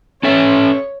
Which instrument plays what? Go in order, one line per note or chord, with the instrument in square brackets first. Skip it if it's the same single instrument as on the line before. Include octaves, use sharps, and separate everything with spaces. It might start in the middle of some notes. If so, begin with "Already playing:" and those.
[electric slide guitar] C#4 A4 E5 [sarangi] C#5